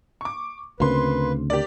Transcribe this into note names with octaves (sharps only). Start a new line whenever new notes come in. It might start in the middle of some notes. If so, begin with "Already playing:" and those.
C#6 D6
D2 C#3 A#3 C4 B4 C6
G4 A#4 D5